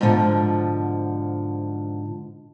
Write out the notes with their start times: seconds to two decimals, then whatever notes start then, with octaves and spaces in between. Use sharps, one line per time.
0.01 G#2 B2 D3 E3 F3